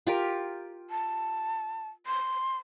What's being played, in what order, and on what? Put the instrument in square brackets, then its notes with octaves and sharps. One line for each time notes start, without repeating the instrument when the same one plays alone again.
[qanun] F4 G4 A#4
[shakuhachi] A5
C6